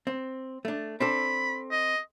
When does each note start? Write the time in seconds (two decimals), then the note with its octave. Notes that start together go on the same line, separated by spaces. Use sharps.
0.07 C4
0.65 A3 D4
1.00 C4 D4 A4 B5
1.71 D#5